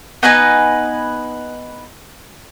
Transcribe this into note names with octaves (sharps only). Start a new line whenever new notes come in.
B3 D#4 B4 G#5